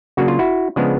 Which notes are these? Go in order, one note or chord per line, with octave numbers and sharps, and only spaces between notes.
C#3 F#3 A#3 D4 F#4
F4
E4 F#4
C#3 F3 G#3 B3 D4